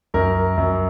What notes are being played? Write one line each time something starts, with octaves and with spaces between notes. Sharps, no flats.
F#2 A#4
F#2